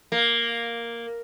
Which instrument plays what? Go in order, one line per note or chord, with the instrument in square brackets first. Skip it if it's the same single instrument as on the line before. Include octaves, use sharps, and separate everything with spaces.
[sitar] A#3